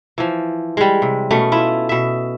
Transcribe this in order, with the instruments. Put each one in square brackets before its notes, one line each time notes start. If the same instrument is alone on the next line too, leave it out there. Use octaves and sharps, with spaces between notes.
[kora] E3 F3
G3 G#3
C3
B2 A3 C#4
E4 F4 E5
B2 E5